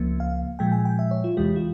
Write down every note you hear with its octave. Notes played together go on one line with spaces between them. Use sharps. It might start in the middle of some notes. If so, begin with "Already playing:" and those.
Already playing: C#2 C#3 F3 A#3
F5
A#2 F3 G#3 G5
G#5
G5
E5
C#5
F4
E2 C3 E3 G#3 G4
F4